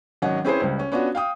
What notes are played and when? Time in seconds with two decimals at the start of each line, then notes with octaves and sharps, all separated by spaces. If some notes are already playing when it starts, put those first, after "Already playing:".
0.22 G#1 F#3 C#4 D#5 F#5
0.44 C4 C#4 E4 G#4 B4 C5
0.61 C#2 G3
0.79 C#4
0.92 B3 C#4 D4 F4 F#4
1.15 F5 G5 D#6